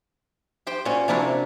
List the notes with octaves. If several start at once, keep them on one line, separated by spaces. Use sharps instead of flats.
G4 C5 G5
A#2 C#4 F#4 G#5
C3 A#3 D4 E4 F#4